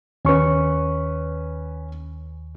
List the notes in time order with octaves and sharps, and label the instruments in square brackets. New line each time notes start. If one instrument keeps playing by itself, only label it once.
[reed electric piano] D#2 C#6 [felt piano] C#4 B4